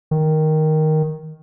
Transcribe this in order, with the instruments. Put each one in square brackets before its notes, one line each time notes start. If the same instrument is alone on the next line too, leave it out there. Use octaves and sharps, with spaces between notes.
[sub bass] D#3